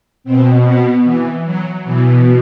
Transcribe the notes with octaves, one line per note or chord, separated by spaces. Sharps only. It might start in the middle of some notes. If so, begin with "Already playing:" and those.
B2 C4
B3
E3
F#3
B2 E3